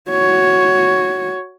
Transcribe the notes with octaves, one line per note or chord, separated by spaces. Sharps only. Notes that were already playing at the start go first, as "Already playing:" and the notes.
F#4 C#5